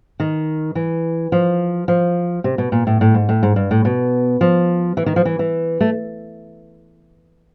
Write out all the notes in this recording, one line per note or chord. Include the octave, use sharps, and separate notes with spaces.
D#3
E3
F3
F3
C3
B2
A#2
A2
A2
G#2
A2
G#2
G2
A2
B2
F3
E3
D#3
F3
E3
E3
A3